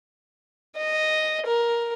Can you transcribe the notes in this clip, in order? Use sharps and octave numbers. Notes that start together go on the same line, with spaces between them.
D#5
A#4